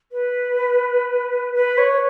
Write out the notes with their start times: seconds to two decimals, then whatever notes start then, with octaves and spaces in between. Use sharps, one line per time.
0.12 B4
1.54 B4
1.77 C#5